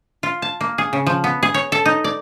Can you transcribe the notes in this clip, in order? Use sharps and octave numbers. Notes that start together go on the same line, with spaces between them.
F4
A5
A#3
G#4
C#3
F3
B3
G#4
C#5
A4
D#4
D5